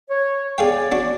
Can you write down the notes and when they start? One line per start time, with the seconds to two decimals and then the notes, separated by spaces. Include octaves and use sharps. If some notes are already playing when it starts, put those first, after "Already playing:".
0.08 C#5
0.58 B3 G#4 C#5 D5 F5 G5
0.92 D4 F#4